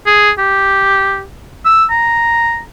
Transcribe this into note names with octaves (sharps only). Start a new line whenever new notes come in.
G#4
G4
E6
A#5